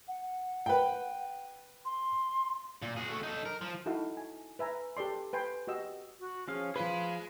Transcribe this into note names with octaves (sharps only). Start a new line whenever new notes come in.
F#5
B4 G5
C6
A#2
F#4 G#4
A3 F#4
D#4 A4
A#4
F3
D#4 E4 F#4 A4 F5
G#5
B4 E5 G#5 A#5
G4 A4 D5 C6
B4 G5 G#5 C6
F#4 G4 D#5 E6
F#4
F3 C#4 G#4 F5
F3 G#4 B4 F5 B5 C6